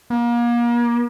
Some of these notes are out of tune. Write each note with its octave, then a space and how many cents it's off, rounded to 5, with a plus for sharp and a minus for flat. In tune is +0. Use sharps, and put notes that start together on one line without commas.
A#3 +35